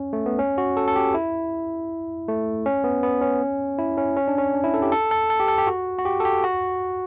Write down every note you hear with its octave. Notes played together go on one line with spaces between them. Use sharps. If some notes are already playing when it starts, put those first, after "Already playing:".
Already playing: C#4
A3
B3
C#4
F#4
A4
A4
G4
E4
A3
C#4
B3
B3
C#4
E4
C#4
C#4
D4
C#4
D4
E4
A4
G4
A4
A4
A4
G4
A4
G4
F#4
F#4
G4
A4
G4
F#4